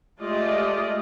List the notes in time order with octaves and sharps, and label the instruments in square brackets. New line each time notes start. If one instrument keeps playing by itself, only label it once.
[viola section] G#3 A3 F4 G4 D5 D#5